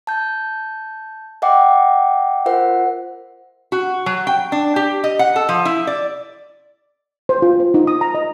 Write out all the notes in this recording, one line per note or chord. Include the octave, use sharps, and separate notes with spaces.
A5 G6
D#5 E5 F#5 G5 D6
F4 A#4 C5 E5 F#5
F#4
F#3
G5
D4
G4
D#5
F#5
A4
F3
E4
D5
C5
F4
C5
D#4
D#6
A#5
D#5